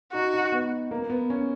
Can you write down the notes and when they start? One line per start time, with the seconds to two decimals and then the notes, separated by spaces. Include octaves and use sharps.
0.13 D#4 F#4
0.33 D#4
0.52 B3
0.91 A#3
1.10 B3
1.30 C#4